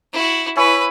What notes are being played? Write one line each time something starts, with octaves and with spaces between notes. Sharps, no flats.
E4 F#4
E4 B4 C#5 G#5